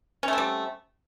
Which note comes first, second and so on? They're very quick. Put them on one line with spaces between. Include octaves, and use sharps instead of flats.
C#4 A3 C4 G3